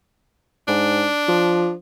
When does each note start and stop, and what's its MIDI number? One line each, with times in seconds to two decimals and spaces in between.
0.68 1.08 44
0.68 1.73 62
1.29 1.74 53